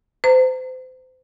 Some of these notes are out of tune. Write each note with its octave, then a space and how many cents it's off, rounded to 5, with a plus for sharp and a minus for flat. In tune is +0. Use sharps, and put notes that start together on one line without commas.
C5 -30 A#5 -30